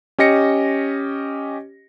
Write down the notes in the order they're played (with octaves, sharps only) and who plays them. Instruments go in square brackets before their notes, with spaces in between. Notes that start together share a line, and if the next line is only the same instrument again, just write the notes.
[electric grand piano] C#4 G4 D#5 A#6 C#7